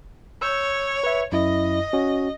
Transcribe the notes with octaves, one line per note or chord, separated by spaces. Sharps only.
C#5 E6 G6
B4 E5
F#2 E4 D#5
C#4 F#4